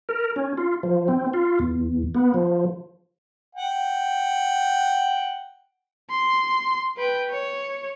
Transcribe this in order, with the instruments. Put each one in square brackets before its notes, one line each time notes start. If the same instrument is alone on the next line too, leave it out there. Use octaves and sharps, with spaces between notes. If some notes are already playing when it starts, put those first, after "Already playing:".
[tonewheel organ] A#4
C#4
F4
F3
C4
F4
E2
B3
F3
[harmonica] F#5 G5
[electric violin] C6
B4 G5
C#5